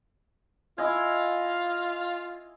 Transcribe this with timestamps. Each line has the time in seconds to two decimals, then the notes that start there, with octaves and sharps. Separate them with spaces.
0.78 E4 F4 D#5 G#5